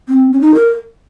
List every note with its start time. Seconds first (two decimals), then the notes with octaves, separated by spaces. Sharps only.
0.09 C4
0.32 C#4
0.41 D#4
0.54 A#4